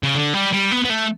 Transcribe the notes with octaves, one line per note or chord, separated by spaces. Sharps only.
C#3
D3
G3
G3
B3
B3
A3